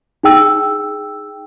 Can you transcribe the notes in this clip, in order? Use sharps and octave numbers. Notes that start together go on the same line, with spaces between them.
D#4 G#4 G5 E6